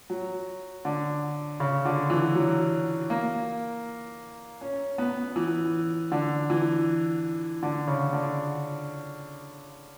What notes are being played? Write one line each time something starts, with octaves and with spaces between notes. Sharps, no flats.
F#3
D3
C#3
D3
E3
F#3
A#3
C#4
B3
E3
D3
E3
D3
C#3
D3